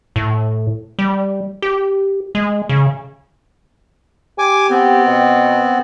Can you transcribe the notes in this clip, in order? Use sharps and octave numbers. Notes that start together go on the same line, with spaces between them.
A2
G3
G4
G#3
C#3
G4 G#5 D6
B3 C4
B2